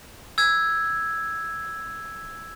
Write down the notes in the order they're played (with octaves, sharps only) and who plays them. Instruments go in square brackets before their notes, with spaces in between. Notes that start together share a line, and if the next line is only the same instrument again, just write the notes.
[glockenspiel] E6 G#6